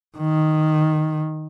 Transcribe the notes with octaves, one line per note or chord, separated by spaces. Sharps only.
D#3